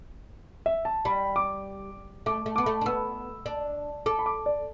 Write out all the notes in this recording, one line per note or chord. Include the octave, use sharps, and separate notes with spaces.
E5
A5
G3 B5
D6
A3 D6
A3
B3 D6
A3
D4
B3 E6
D4
A4 D6
B5
D6
D5